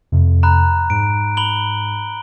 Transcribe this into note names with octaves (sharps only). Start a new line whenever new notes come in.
F2 C3
A#5 B5 F#6
G#2 D7
B5 F#7 G7